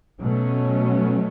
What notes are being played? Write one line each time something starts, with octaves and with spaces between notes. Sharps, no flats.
B2 F#3 A3 C#4